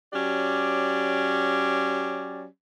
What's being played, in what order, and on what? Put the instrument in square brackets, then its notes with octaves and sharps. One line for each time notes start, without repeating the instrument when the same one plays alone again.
[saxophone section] F#3 C#4 G4 D5